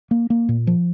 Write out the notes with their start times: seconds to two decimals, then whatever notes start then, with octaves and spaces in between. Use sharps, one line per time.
0.11 A#3
0.30 A#3
0.49 A#2
0.67 F3